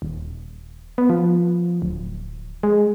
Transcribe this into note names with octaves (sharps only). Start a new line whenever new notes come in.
D#1
B3
F3
D1
G#3